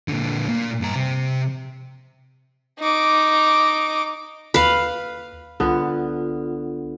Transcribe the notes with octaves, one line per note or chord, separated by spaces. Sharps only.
A#2 D3
A#2
G2 A#5
C3
D#4 D6
D#2 B4 F5
C2 D3 B3 F4